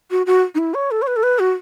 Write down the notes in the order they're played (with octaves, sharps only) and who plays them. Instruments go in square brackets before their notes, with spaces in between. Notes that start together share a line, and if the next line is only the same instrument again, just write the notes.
[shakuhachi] F#4
F#4
D#4
E4
C#5
A4
C#5
B4
A4
B4
F#4